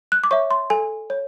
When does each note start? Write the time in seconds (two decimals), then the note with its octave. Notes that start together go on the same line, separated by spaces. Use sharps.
0.12 F#6
0.24 D6
0.31 C#5 E5 C#6
0.51 C6
0.70 A4 G#5
1.10 C#5